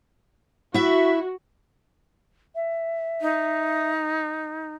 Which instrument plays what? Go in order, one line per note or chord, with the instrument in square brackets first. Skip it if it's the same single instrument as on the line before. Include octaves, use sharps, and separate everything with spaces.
[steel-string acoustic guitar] E4 E5 [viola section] F#4
[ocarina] E5
[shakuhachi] D#4